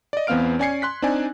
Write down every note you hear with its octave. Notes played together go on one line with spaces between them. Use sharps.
D5 D#5
E2 B3 C4 F5 F6 D7
C#4 D5 G#5 G#6 C7 C#7
C6 F#6 B6
C4 D4 D#4 D5 G#5